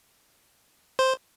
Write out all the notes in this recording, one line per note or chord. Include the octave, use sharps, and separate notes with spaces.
C5